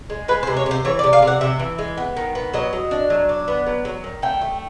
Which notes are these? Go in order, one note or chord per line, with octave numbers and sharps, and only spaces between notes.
G#3
G#3 B4
C5
C3
C#5
C3 C5
E3 C#5
D5
C3
F5
C3 F#5
C3 E5
E3
G#3
B3
D#3
B3
F#3 D#5
F#3
D4
F#3
D4
B3
F#3
F#3
D#3
A3 G5
A3